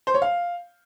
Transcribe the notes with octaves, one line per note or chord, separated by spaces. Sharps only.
C5
C#5
F5